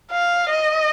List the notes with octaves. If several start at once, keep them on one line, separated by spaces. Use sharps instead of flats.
F5
D#5